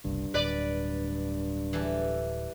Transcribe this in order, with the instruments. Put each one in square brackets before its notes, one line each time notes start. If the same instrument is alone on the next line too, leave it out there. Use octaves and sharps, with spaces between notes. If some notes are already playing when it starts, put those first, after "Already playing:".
[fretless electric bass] F#1 C2 [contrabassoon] G2
[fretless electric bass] D1 [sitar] B4 D5
[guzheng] E3 G3 A4